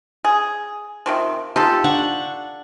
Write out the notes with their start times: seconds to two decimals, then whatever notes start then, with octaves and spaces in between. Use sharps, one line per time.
0.25 G#4
1.06 C3 D#3 F3
1.56 D#4 F4 G4 A4
1.84 D4 F#5 C#6